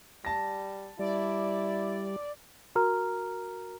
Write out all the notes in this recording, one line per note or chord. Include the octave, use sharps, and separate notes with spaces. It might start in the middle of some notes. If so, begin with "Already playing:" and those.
G3 A5 A#6
G3 E4 D5
F#4 A#4 A#5 F6